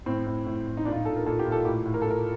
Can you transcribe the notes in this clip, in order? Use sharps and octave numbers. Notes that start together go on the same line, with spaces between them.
A2 C4
A2
A2
A2
D#4
A#2 D4
F4
D#4
A#2 A4
A#4
A#2 A4
G4
A#2
A4
A2 G4
A2
A#4
A4
A2 A#4